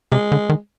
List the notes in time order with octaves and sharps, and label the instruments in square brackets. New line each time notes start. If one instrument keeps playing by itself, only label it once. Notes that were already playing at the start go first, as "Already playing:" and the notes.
[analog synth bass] C3 [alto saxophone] G#3
[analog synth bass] D3
D#3